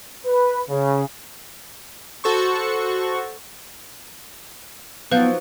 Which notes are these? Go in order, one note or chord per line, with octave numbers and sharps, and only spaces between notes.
B4
C#3
F#4 A4 C5 C#6
F3 F#3 B3 D#4 B4 F5 G6